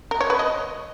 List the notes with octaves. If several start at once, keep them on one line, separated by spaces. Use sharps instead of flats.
A#4
C#5
B4
D#5